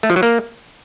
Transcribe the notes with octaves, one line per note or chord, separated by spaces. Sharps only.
A3
F3
F#3
A#3